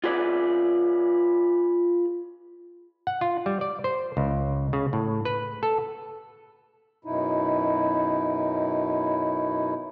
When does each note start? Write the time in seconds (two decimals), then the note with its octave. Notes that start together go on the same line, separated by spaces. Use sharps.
0.04 F4 G#4 B4 D5
3.07 F#5
3.21 F4
3.46 G3
3.61 D5
3.84 C5
4.17 C#2
4.73 C#3
4.93 A2
5.25 B4
5.63 A4
7.05 F#2 B2 D#4 E4